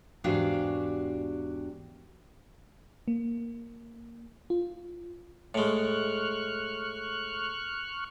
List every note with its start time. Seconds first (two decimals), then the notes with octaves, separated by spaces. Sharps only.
0.24 E2 G#2 D4 F#4 G4 F5
3.08 A#3
4.50 F4
5.54 A2 G#3 C#6 F6 F#6